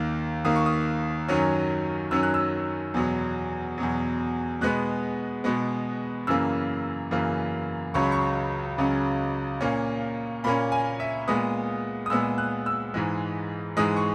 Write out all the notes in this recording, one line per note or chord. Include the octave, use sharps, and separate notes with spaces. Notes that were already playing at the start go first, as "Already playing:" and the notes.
Already playing: D#2 D#3 A#3
D#2 D#3 A#3 D#6
C#6
D#6
F#2 D#3 F#3 C#4
F#2 D#3 F#3 C#4 E6
F#6
E6
E2 B2 F#3
E2 B2 F#3
B2 G#3 B3 F#6
B2 G#3 B3
F#2 C#3 E3 A#3 E6
F#2 C#3 E3 A#3
C#2 C#3 F#3 C#4 C#6
B5
C#6
C#2 C#3 F#3 C#4
A#2 A#3 C#4
A#2 A#3 C#4 B5
G#5
E5
A#2 G#3 B3 D#6
D#6
A#2 G#3 B3 E6
F#6
E6
G#2 E3 G#3
G#2 E3 G#3 D#6
C#6